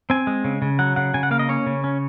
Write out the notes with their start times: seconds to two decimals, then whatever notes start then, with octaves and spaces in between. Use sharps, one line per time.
0.10 C4 G#5
0.27 G#3
0.44 C#3
0.62 C#3
0.79 F#3 F#5
0.96 C#3 F#5
1.14 C#3 G#5
1.23 F#5
1.31 A#3 F5
1.39 D#5
1.49 C#4 C#5
1.66 C#3
1.84 C#4